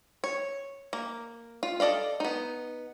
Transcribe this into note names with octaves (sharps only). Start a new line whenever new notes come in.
C#5
A#3
F4
A4 D5 D#5 F5
B3 D#4